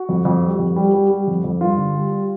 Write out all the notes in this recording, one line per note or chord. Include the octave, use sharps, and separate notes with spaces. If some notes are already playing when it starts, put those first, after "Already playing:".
Already playing: F#4
F2
F2
G3
F2
G3
G3
G3
F2
F2
G2 F4
D3
G3
G3